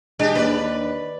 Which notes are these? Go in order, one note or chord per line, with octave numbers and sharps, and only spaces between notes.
G#3 D4 G4
D#2 B4 D5